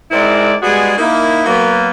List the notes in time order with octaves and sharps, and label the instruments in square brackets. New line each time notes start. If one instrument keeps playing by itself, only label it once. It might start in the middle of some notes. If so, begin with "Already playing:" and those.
[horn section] G#2 G#3 C4 E4 A#4 D5
G3 G#3 B3 F#4 G#4
A#3 D#4 E4
F#3 A#3 B3